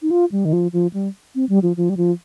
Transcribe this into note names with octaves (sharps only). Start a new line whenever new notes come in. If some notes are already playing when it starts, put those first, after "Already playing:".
D#4
F4
G3
D#3
F3
F3
G3
C4
G3
F3
F3
G3
F3